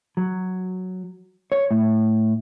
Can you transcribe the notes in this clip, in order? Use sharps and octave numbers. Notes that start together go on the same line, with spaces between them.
F#3
C#5
A2